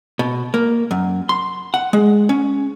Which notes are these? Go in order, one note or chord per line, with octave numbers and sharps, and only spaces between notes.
B2
A#3
F#2
C6
F#5
G#3
C#4